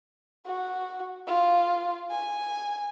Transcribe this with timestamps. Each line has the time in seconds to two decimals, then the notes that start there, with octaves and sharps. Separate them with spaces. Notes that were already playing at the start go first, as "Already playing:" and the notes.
0.46 F#4
1.27 F4
2.11 G#5